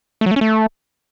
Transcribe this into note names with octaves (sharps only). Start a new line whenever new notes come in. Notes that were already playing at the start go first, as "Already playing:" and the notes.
A3
F#3
A3
C#4
A3